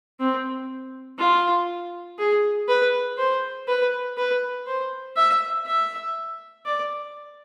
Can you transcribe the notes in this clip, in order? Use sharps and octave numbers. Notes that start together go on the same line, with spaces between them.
C4
F4
G#4
B4
C5
B4
B4
C5
E5
E5
D5